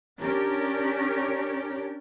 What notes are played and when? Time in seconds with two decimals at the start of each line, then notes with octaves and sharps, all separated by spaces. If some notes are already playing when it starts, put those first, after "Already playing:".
0.19 C#4 D4 G4 A#4